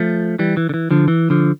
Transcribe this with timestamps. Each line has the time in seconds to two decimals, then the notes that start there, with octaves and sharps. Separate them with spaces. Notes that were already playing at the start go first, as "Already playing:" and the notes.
Already playing: F3 A3
0.39 E3 G3
0.57 E3
0.69 D3
0.74 E3
0.91 D3 F3
1.08 E3
1.30 D3 F3